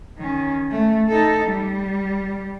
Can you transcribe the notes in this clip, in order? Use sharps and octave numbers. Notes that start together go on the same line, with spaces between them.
D#3 C#4
A3
D#4 A4
G3